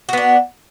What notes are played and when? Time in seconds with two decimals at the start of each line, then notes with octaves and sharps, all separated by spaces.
0.09 F#4
0.13 B3
0.17 D4